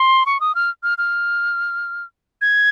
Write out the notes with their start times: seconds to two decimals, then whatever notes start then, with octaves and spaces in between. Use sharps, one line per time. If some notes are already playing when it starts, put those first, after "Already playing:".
Already playing: C6
0.26 C#6
0.40 D#6
0.55 F6
0.83 F6
0.98 F6
2.41 G#6